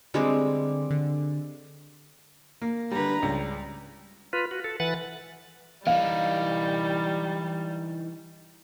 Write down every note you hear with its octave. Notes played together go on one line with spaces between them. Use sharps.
D3 G3 G#3 C4
D3
A#3
D3 G3 B4 A#5
C#2 G3
F4 B4
F#4
A4
E3 B4 F#5 A6
E3 G3 D#4 F5